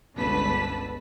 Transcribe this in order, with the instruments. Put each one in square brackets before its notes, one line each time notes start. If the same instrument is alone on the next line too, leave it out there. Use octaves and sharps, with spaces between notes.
[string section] G1 C#2 D3 B4 A5 B6